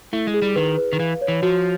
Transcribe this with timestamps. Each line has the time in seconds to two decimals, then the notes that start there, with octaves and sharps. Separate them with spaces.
0.13 A3 E4
0.27 G#3
0.34 G#4
0.42 G3
0.56 D#3 B4
0.78 B4
0.93 D#3
1.00 E3 F5
1.21 C#5
1.28 E3
1.42 F3 F#4